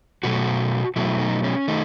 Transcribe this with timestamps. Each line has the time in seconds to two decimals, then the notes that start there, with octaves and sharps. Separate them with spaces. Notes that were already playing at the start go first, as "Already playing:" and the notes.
0.23 B2 F#3 A3 F#4
0.96 B2 F#3 A3 E4
1.19 D#4
1.44 C#4
1.68 D#3 A3 D#4